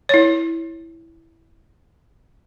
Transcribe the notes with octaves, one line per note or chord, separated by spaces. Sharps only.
E4 C#5